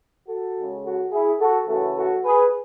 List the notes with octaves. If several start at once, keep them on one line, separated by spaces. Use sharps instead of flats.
F#4 A4
C#3 G#3
F#4 A4
E4 G#4
F#4 A4
C#3 E3 A3 F#4 A4
F#4 A4
G#4 B4